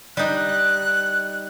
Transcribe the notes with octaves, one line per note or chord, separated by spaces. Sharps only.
G3 D#4 F#6